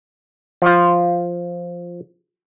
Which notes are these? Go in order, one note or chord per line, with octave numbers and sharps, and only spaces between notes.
F3 F4